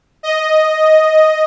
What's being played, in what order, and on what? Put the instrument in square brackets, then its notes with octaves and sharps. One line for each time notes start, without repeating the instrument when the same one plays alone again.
[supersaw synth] D#5